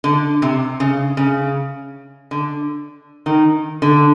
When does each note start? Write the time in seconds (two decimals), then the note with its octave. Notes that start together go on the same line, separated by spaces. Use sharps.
0.04 D3
0.42 C3
0.80 C#3
1.17 C#3
2.31 D3
3.26 D#3
3.82 D3